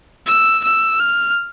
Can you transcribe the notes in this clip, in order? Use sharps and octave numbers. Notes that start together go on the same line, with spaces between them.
E6
E6
F6